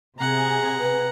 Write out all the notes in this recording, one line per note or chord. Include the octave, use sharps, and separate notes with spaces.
C3 G#4 F#5 A#5
B4